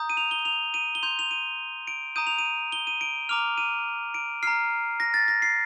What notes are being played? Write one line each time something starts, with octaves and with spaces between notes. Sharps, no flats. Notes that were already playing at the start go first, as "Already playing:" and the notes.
Already playing: A#5 D#6 G6
D#7
F7
G7
F7
D#7
G7
C6 G6 F7
F7
D#7
D7
A#5 D#6 G6 D#7
F7
D#7
G7
D#7
D7
A#5 D6 F6 F7
D#7
D7
A#5 F6 C7
A#6
A6
A#6
C7